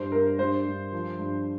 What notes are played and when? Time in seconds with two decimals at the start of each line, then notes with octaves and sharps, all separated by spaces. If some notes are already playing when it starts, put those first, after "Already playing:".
Already playing: G2 C5
0.12 G2 A#4
0.39 G2 C5
0.65 G2
0.92 F3
1.19 G2